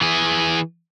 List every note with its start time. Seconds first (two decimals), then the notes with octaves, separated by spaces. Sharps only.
0.01 E3 G#4